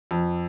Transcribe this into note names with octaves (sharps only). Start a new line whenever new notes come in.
F2